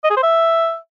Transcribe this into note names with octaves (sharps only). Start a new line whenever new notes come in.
D#5
G#4
C5
E5